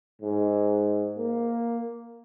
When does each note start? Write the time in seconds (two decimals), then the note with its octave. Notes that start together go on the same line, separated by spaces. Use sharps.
0.21 G#2
1.18 A#3